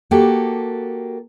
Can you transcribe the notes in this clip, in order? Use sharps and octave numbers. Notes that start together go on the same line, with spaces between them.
A#3 F#4 G4 A4